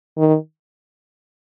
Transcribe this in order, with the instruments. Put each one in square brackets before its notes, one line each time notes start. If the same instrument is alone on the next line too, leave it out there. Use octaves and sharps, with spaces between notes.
[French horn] D#3